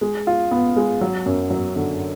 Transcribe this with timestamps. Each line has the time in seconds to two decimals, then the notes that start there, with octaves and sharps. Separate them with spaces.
0.01 G#3
0.27 F4
0.51 B3
0.76 G#3
1.01 F#3
1.26 F#2
1.50 F#3
1.76 D3